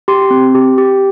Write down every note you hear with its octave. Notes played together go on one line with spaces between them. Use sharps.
G4 C6
C4
G4
G4